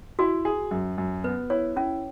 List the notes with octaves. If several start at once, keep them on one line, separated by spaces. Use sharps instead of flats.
E4 F#4
G#4
F#2
F#2
B3 B4
E4 C#5
C#4 E4